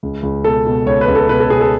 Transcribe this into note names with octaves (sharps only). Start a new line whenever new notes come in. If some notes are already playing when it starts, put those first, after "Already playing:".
C#2
C#2
B2 A4
B2
C#2 C#5
B4
C#2
A4
B2 B4
A4
B2 G#4
A4